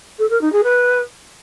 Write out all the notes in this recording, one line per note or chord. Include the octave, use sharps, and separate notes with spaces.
A4
A#4
D#4
G#4
B4